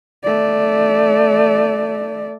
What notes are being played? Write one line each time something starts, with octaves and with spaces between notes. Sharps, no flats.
A3 D5